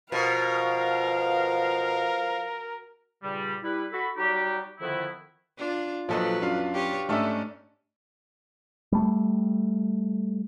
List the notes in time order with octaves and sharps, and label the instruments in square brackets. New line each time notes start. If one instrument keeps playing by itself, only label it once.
[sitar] B2 [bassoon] F3 [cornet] A#4 [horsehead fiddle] F5
[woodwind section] G2 A#2 C#3 G3
G3 E4 B4
F#4 A4 B5
F#3 G3 D#4 F#4 G4
F2 D3 D#3 F3 B3 E4
[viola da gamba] D4 F4
[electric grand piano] A#2 [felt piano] F3 A4 D#5 [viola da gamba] F#3 B4
[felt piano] F#2 [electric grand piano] D4 F4 F5
[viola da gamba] G4 B4 C#5
[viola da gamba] G#2 C#4 [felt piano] A3 D4 A4 [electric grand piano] E5 F6
[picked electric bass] G3 A3